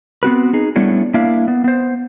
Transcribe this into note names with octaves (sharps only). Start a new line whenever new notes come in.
B3 C4 F#4 B4
D#4 G#4
G3 A3 B3 C#4 D4 E4
A#3 D4 E4 E5 F5
B3
B3 C5